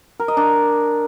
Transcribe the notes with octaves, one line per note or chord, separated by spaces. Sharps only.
A#4
D#5
D4